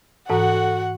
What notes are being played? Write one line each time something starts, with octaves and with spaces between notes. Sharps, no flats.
G#2 E3 F#4 A4 F#5 A#5